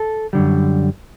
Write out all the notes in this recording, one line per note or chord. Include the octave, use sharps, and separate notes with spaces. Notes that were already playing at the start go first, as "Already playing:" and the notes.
Already playing: A4
F#2 D3 G3